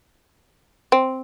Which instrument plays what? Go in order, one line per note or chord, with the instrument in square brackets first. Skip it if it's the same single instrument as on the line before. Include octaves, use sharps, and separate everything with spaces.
[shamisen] C4